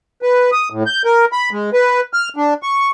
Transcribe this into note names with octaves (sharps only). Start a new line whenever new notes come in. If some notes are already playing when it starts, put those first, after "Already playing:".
B4
D#6
A2
G6
A#4
B5
G#3
B4
F6
D4
C#6